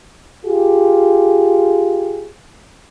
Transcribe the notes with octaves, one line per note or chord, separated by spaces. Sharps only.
F4 G4 G#4